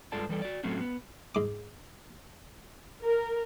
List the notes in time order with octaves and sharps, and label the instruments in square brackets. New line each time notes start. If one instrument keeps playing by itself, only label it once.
[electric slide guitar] G2 G#3 F4 A4 D5 A5
E3 G3 A4 D5
F#4 D5
A2 F#3 A3 C4 C#4 F#4
B3
[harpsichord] G#2 D6
[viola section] A#4